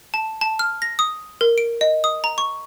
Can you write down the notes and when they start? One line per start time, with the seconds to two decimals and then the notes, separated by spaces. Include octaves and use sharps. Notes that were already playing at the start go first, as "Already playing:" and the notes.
0.14 A5
0.41 A5
0.59 F6
0.82 A#6
0.99 D#6
1.41 A#4
1.58 D7
1.81 D#5
2.04 D#6
2.24 A#5
2.38 C#6